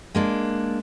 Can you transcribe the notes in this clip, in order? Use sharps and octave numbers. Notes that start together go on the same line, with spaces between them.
G#3 A#3 D4